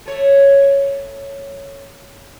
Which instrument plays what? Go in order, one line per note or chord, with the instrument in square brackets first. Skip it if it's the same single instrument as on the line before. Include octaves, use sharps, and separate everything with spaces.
[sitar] A3 C#5